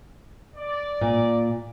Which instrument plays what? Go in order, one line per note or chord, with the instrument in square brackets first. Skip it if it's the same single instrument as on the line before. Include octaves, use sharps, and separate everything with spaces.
[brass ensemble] D5
[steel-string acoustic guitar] A#2